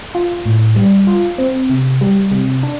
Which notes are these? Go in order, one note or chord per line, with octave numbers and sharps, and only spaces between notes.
F4
A2
G3
F4
C4
C3
G3
C3
D4